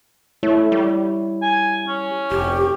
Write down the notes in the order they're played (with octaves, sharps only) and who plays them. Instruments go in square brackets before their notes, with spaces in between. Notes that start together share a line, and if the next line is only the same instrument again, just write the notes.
[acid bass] A3 [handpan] E4 C#5
[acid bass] G3
[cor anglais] G#5
C#4
[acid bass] F1 [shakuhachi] G4